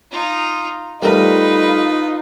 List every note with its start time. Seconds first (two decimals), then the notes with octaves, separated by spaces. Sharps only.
0.12 D#4 F4
1.02 G3 A3 D#4 F4 A#4 B4